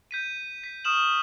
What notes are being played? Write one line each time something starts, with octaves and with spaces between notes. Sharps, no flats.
G6 B6 D#7
B6
C#6 D#6 F6 E7 F#7